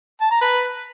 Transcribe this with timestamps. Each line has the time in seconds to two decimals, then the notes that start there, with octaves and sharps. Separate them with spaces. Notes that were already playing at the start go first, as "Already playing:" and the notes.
0.21 A5
0.31 A#5
0.41 B4